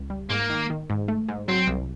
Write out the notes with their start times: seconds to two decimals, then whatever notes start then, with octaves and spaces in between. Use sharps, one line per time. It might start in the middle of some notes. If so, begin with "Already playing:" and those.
Already playing: C#2
0.10 G3
0.29 G#2 A#3
0.50 D#3
0.70 D#3
0.90 G#2
1.08 A3
1.29 G#2
1.48 F#3 C4
1.67 C2